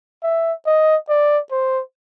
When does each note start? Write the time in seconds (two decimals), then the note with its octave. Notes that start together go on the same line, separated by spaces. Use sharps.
0.23 E5
0.67 D#5
1.09 D5
1.51 C5